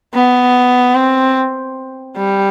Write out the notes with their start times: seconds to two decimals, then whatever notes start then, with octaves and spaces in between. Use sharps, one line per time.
0.14 B3
0.95 C4
2.17 G3